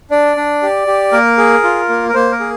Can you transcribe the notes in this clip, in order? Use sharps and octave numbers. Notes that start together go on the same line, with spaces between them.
D4 D5
D4
G4
G4
A#3 A#4
G#4
F4
A#3
A#4
A#3 C5
A#4
G#4